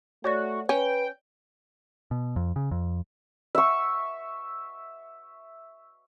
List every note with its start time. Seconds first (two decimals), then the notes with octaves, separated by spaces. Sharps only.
0.24 A3 F#4 C#5 D5 C#6
0.69 C#4 B4 G5
2.11 B2
2.36 F2
2.56 C#3
2.71 F2
3.55 E5 C#6